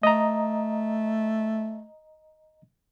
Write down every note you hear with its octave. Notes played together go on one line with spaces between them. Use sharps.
A3 D#5 A#5